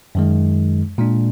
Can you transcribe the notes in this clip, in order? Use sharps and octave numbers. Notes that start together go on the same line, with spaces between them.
F#2 D#3 G#3
A#2 G#3 D4